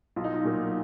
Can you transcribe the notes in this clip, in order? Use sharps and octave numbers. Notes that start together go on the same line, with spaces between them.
B1 F4
D#4
F4
A#2 F#3 A#3